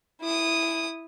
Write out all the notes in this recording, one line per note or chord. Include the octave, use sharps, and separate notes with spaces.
E4 D#6